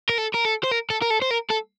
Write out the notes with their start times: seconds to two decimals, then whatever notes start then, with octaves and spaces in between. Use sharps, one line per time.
0.09 A#4
0.18 A4
0.34 A#4
0.45 A4
0.64 C5
0.72 A#4
0.90 A4
1.02 A#4
1.10 A4
1.22 C5
1.30 A#4
1.50 A4